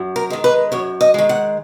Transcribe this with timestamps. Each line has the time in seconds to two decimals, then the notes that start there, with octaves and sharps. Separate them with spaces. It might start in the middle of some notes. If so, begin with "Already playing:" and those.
Already playing: F#2
0.16 A#4
0.30 D#3 G#3
0.44 B4
0.72 F#2 C#5
1.01 D#5
1.14 D#3 G#3
1.29 F#5